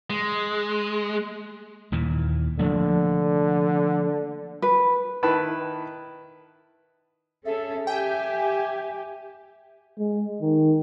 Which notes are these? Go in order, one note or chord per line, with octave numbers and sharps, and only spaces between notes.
G#3
D#2 A#2 E3
D3 F3 A3 A#3
B4
D#3 E4 B4 A5
C#4 G#4 A4 E5
G4 E5 G5 G#5
G#3
D#3